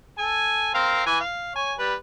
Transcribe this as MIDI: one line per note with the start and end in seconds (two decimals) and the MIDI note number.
0.18 0.71 69
0.18 0.71 80
0.74 1.04 60
0.74 1.04 70
0.74 1.04 77
1.06 1.19 52
1.06 1.19 80
1.21 1.55 77
1.55 1.73 73
1.55 1.73 80
1.79 1.94 55
1.79 1.94 71